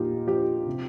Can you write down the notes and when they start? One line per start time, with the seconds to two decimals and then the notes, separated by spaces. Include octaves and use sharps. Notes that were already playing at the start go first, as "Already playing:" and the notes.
Already playing: A#2 F3 D#4 F4 G4
0.27 F3 G4
0.66 C3